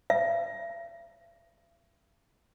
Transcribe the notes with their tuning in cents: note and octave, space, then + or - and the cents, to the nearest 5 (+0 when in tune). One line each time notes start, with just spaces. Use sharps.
E5 +45